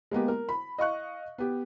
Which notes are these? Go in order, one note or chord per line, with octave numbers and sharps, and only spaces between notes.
G#3 A#3 B3 G4
A#4
B5
D#5 F5 C#6 F#6
B3 G4